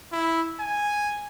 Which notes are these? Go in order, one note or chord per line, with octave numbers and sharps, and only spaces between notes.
E4
G#5